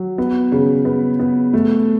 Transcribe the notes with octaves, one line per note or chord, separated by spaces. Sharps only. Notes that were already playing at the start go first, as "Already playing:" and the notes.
Already playing: F#3
B3
C#3
B3
B3
A3